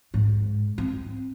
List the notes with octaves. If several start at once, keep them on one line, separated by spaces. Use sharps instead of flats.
G#2
C4